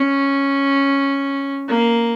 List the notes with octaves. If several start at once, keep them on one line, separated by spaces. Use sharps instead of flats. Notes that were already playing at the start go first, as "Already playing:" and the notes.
Already playing: C#4
A#3